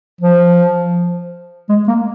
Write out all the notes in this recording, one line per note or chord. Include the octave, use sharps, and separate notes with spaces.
F3
G#3
A#3